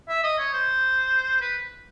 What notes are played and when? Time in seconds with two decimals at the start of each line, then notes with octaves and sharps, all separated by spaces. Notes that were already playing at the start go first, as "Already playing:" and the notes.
0.09 E5
0.23 D#5
0.39 C#5
0.53 C5
1.41 B4